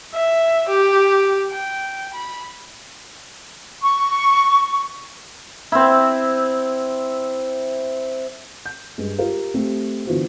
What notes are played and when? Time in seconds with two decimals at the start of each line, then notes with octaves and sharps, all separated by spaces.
0.14 E5
0.69 G4
1.51 G5
2.14 B5
3.82 C#6
5.72 C4 E4
8.66 G6
8.98 G2 G#3
9.18 F4 G4 A#4 F5
9.54 A3 C4 G4 A4
10.06 D3 E3 B3 F4 F#4 C5